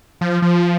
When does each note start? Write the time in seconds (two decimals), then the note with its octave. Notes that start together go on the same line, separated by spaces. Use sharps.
0.21 F3
0.42 F3